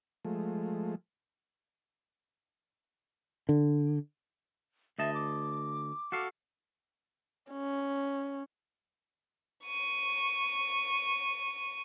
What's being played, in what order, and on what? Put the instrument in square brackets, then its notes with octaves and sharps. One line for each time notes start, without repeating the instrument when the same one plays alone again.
[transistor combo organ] F3 G#3 A3
[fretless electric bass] D3
[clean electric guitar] D2 D#5 A5 [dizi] E5
[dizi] D6
[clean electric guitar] F#4 A4 F5
[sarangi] C#4
[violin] C#6 D#7